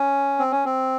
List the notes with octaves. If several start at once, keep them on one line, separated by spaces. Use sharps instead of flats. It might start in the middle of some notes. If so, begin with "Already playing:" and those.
Already playing: C#4
C4
C#4
C4